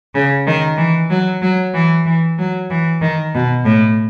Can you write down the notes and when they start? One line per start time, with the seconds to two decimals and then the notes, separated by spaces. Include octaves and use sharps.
0.14 C#3
0.46 D#3
0.77 E3
1.10 F#3
1.41 F#3
1.74 E3
2.05 E3
2.38 F#3
2.70 E3
3.01 D#3
3.34 B2
3.65 A2